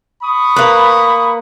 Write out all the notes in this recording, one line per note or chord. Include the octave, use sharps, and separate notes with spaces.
B5 C#6 D#6
A#3 B4